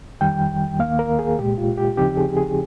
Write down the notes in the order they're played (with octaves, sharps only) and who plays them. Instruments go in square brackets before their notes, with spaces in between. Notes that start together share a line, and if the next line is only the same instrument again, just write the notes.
[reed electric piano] F2 D#3 G3 G5
D#2 D#3 A#3 F5
A#4
G#4
C2 A#2 G#3 G4
F4
G4
D#2 C#3 F3 C4 D#4 G4
G#4
G#4